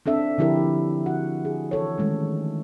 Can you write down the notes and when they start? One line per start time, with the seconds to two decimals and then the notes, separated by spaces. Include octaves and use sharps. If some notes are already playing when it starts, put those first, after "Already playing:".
0.06 C4 D4 A4 E5
0.38 D3 F3 E4 G4 A#4
1.06 F#4 F#5
1.45 G#4
1.71 E3 A4 C#5
1.98 D#3 G#3 A3 C#4